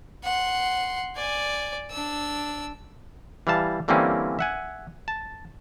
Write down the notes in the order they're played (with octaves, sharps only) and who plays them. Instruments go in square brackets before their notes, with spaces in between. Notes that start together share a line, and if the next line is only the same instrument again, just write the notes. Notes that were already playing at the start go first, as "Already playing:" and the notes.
[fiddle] F#5 C6
D5 G#5
D4 E6
[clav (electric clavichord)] E3 G3 F5 A5
D3 E3 G3 A#3 C4 C#4
E5 F#5 G#5
A5